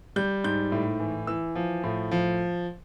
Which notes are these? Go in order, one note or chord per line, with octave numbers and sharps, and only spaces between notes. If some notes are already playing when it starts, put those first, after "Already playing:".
G3 G6
G#2 G6
A2
E3
E3 E6
F3
A2
F3